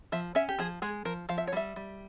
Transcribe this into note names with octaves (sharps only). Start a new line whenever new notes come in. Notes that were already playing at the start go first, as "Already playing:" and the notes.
F3 E5
C#4 E5
G4
F3 G#4
G#3 G#4
F3 A#4
F3 F5
E5
C#5
G3 E5
G3